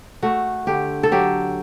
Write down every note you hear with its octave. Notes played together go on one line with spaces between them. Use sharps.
A3 F#4
D3 G4
A4
F#3 G4